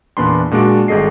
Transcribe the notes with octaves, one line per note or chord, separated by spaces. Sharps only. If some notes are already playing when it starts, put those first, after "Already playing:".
E2 A#2 B3 D4 B5 C6
A#2 G#3 D4 F#4 D7
G#1 G3 G#4 A4 D#5 C7